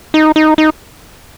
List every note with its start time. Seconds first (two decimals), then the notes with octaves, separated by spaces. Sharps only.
0.14 D#4
0.36 D#4
0.58 D#4